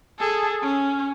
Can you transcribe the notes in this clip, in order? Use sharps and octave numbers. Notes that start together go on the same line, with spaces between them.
G#4 A4
C#4